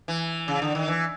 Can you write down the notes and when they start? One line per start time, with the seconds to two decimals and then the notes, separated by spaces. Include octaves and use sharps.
0.08 E3
0.48 C#3
0.62 D3
0.75 D#3
0.88 E3